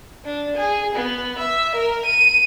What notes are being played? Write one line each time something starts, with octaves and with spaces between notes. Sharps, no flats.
D4
G#4
B3
E5
A#4
D#7